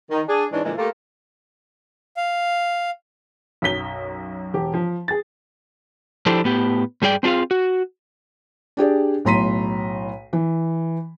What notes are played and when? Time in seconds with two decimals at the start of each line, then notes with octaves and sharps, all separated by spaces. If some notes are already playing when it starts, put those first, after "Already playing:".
0.11 D#3
0.28 D4 G#4
0.52 G#2 E3 G#3 C#4 D4
0.64 A#2 D3 E3 F3 G#3 E4
0.78 A3 A#3 F4 G4 A4 A#4
2.17 F5
3.62 B1 F#2 B6 G7
4.54 E1 G4
4.74 F3
5.08 G#4 A6
6.26 F3 D4 E4 G4 A4 C5
6.44 A2 B3 G4
7.02 G2 G3 G#4 D5 G5
7.23 C4 D4 F4 G#4 F5
7.51 F#4
8.77 D4 G4 G#4 D5
9.25 B1 A2 A#5 C6 B6 D#7
10.33 E3